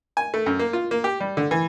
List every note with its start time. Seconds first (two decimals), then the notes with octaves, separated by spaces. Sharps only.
0.17 G#5
0.34 A3
0.46 F#2
0.59 A#3
0.73 F4
0.91 A#3
1.04 G4
1.20 G3
1.37 D3
1.51 E3